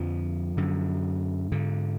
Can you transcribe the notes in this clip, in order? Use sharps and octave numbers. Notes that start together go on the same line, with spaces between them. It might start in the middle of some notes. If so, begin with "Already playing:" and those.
Already playing: F2 D3 F3
F#2 D3
G#2 D3